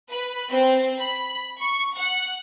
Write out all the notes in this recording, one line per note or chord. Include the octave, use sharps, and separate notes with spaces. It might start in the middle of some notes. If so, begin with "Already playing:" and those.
B4
C4
B5
C#6
F#5